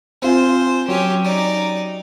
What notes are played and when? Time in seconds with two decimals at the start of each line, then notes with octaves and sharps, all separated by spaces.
0.22 C4 F4 C5 G#5
0.88 F#3 C#4 G4
1.25 D#4 D5